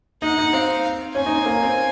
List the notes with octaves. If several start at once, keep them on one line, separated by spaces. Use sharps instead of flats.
D#4 F#5
D#4
C4 F5
C#4 G#5
D#4
C4
A#3
C4